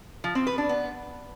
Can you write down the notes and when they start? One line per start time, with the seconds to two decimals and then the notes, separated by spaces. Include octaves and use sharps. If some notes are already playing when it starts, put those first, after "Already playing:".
0.24 F3
0.35 C4
0.47 B4
0.58 D4
0.69 B3